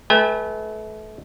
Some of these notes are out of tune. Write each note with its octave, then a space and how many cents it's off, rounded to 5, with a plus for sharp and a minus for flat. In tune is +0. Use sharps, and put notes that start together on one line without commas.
A3 -35 B4 -15 G#5 -45